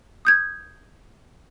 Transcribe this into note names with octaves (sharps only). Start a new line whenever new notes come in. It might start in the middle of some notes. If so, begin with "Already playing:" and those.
D#6 G6 G#6